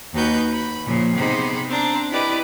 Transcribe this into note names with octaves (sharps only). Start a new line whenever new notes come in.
D#2 D#4 F#4 B4 G6
B5
A#2 C#3 F3
C3 B3 D#4 G#4 C5 B5
C4 D4 A#5
E4 G4 B4 D5 D#5